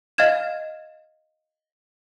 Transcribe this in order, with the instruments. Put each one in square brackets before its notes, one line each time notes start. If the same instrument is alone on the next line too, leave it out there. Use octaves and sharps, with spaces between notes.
[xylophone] D#5 F5 F6 G#6 E7